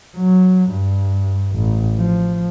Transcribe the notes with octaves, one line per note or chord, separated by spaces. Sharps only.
F#3
G2
A1
F3